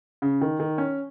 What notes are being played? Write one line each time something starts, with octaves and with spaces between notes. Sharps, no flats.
C#3
D#3
D#3
C#4